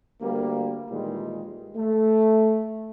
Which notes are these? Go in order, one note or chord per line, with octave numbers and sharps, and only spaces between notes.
D2 G3 A#3
A#2 D#3 E3 G3 G#3
A3